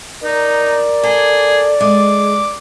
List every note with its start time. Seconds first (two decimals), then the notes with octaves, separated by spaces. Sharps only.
0.24 D#4 A#4 D5
1.03 G#4 A4
1.81 G#3 D6